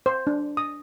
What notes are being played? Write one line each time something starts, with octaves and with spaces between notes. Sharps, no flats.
C5
D4
D#6